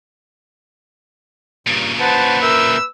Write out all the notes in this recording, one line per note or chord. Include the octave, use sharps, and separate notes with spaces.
G2 A#2 C#3
B4 C5 F#5 A5
A#4 E5 E6 G6